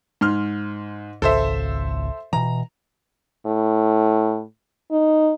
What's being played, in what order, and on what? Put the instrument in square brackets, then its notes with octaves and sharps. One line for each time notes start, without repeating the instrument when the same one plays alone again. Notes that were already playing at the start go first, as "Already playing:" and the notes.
[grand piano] G#2 C6 F6
[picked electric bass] G#1 C#2 [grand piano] A4 C5 E5
[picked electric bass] B2 E3 [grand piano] A#5
[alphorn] A2
D#4